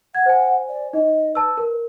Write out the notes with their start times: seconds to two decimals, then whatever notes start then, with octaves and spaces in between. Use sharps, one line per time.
0.15 F#5 G#6
0.26 C5 G#5
0.69 D5
0.93 D#4 D#5
1.35 B4 A5 E6
1.57 A#4